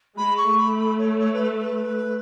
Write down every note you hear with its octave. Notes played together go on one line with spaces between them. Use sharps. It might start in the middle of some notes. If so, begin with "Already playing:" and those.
G#3 B5
C#6
A3
B5
B5
C#5
C#5
B4
B4